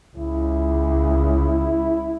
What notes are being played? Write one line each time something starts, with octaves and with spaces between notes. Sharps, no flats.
C#2 E4